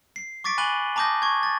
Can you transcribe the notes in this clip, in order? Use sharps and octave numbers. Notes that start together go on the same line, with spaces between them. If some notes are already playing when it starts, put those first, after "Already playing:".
C7
C#6 D6 A6 B6 D7
G#5 B5 F#6 D#7 F#7 G7
A5 A#5 D6 D#6 G6 A#6
C#6 G#6
A6